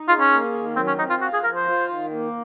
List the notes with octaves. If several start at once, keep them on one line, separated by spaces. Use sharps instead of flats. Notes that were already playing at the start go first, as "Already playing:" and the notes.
Already playing: D#4
F4 G#4
C#4
A#3
D#3
F#3 C4
C#4
C4 D#4
F4
F4 F#4
G#4
F3 A#4
C5
F4
D#3
A#3